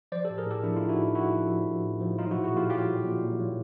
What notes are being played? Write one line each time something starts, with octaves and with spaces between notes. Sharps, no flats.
F3 C5 D5
G4 A4
A2
G#4 A#4
A2 G4 A4
F3 D4 E4
D#4 F4
F3
E4 F#4
A2
A2 E4 F#4
F3
F3
A2
A2
F3
F#3 D#4 F4
E4 F#4
A#2
F#4 G#4
A#2 F4 G4
F#3 F4 G4
F#3
A#2
A#2
F#3